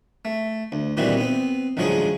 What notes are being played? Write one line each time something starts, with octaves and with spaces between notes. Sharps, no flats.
A3
D2
A#2 D#3 E3 G3 C4 F#4
B3 C4
A1 D2 F3 F#3 G#3 G#4